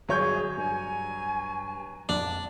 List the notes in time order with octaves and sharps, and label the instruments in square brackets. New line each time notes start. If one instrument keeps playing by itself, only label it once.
[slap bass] G1 [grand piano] F#3 C#5 G6 [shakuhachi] G#4
[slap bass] G2 [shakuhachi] G#5
[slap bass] A#1 F2 G#3 [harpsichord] D4